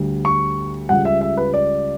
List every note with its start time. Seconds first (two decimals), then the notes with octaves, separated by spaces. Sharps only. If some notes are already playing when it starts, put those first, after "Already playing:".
Already playing: D2 D3 G3
0.25 C#6
0.89 C#2 C#3 G3 F#5
1.05 E5
1.21 E5
1.37 B4
1.54 D5